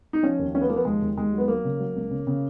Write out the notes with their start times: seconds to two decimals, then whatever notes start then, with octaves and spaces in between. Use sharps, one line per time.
0.13 D#4
0.23 F3 C#4
0.39 D#2
0.54 F3 C#4
0.61 B3
0.69 F3 A#3
0.76 B3
0.85 D#2 G#3
1.02 D#2
1.17 D#2 G#3
1.33 F#3
1.38 B3
1.48 F#3 A#3
1.64 C#3
1.80 F#3
1.95 C#2
2.11 C#3
2.27 C#3